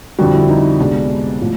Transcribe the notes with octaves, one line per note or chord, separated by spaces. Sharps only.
F2 D3 G3 F#4
E4
D#4
C2 B2 G#3 D4
A2 F3